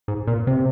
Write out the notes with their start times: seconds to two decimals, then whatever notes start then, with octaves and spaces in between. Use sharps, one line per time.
0.08 G#2
0.27 A#2
0.47 C3